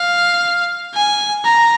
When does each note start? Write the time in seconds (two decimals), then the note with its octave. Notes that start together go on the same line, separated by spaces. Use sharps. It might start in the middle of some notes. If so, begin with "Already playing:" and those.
Already playing: F5
0.95 G#5
1.45 A#5